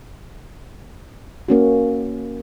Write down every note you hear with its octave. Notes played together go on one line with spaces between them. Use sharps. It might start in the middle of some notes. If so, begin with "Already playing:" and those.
A#3 C#4 F#4